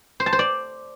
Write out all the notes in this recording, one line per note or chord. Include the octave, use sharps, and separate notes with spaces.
C5
A5
C5
D5